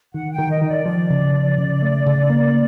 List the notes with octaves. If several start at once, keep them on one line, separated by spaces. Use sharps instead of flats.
D#3 F#5
G5
D#3
D#5
D#3
D5
F3 D5
C#3
F3
C#3
A3
C#3
A#3